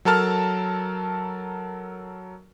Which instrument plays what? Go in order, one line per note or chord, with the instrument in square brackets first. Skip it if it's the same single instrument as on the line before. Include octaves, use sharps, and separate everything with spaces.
[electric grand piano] F#3 A4 A#4 A5 F6